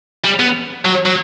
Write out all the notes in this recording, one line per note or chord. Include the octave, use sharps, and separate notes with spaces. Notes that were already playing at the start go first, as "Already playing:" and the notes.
G3
B3
F#3
F#3